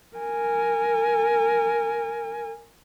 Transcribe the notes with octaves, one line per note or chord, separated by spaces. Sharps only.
A#4 G#5